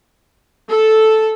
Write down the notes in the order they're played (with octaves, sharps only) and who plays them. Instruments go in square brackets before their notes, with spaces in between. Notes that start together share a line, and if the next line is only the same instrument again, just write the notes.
[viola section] A4